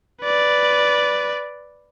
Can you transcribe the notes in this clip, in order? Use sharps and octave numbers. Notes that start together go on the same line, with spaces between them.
B4 D5